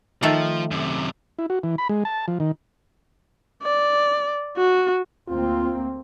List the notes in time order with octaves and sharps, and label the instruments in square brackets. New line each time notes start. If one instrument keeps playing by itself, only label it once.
[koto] D#3 A3 A4 [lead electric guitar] F3
[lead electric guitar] F#2 C3
[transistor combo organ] E4
F#4
E3
B5
G#3
A5
F3
D#3
[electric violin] D5
F#4
[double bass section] D2 A#3 C4 [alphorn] F4